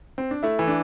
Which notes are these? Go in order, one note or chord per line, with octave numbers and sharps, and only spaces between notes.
C4
D4
A3 E4
E3
D4